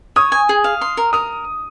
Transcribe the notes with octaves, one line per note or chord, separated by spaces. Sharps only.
C#5 D#6
G#5
G#4
F5
C6
A#4
A#4 D#6